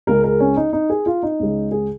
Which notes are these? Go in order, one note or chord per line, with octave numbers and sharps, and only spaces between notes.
C#2 C#3 G#3 A#4
A#4
C#4
D#4
D#4
G#4
F4
D#4
C#2 C#3 G#3
G#4